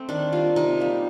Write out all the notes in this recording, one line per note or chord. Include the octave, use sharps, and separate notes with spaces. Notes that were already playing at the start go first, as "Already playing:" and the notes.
Already playing: A3 C4
D#3 D4
G3 A#3 F4
C3 D#4
G3 A#3